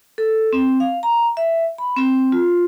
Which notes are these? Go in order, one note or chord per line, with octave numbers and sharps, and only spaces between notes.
A4
C4
F5
A#5
E5
B5
C4
F4